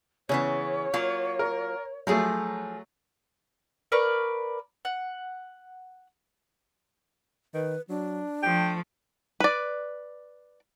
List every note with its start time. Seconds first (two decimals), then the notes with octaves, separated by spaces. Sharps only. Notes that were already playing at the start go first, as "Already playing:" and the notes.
0.29 C#3 E3 B3 C#4 C#5
0.94 F#3 A#3 F4
1.39 A#4
2.07 F3 F#3 A3 F4 G#4
3.92 A#4 B4 D5 C#6
4.85 F#5
7.54 D#3 B4
7.89 F#3 D4
8.43 F3 A3 G5
9.40 B4 D5